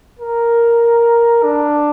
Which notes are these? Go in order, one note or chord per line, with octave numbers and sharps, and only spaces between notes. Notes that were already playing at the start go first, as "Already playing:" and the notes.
A#4
D4